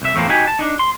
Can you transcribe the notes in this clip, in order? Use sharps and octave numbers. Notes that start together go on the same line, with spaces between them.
C2 E5
E2 A2 F3 A#3 C4
D#4 F#4 G4 G#5
A5
D4 D#4
C6